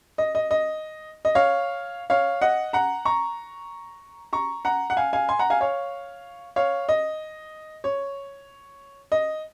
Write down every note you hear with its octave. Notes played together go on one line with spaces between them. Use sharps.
D#5
D#5
D#5
D#5
C#5 F5
C#5 F5
D#5 F#5
F#5 A#5
A#5 C#6
A#5 C#6
F#5 A#5
F#5
F5 G#5
F5 G#5
G#5 C6
F#5 A#5
F5 G#5
C#5 F5
C#5 F5
D#5
C#5
D#5